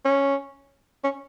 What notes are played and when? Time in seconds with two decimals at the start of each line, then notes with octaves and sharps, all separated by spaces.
0.05 C#4
1.04 C#4